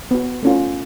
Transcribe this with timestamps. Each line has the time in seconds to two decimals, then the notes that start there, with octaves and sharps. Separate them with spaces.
0.11 B3 F#4
0.43 A3 C#4 F4